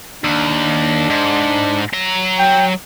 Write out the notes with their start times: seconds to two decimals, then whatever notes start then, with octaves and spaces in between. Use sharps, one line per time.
0.24 D#2 D4
1.10 G#2
1.93 F#3 A#5
2.39 G5